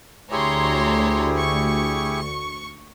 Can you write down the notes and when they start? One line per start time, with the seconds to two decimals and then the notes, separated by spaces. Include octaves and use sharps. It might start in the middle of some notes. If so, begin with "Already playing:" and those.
0.31 D2 E4 G4 G#4 C#5 A#5 C6
1.37 C#6